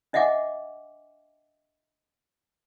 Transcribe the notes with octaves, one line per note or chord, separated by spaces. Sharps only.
D4 D#5 E5 F#5 G#5 D6